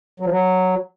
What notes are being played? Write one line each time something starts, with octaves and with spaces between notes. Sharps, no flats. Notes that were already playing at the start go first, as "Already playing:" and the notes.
F#3
F3
F#3